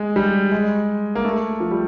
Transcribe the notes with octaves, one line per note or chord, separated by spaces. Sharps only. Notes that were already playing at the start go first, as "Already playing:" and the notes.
Already playing: G#3
G3
G#3
A#3
A3
F3
G3